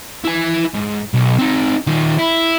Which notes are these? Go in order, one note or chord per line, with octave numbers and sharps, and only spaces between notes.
E4 G#5
G#2
B1
C4 D#4
D#3 F4
E4